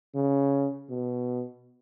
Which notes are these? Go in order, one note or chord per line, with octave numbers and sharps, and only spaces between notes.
C#3
B2